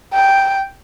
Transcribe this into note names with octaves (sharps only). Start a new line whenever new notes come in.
G5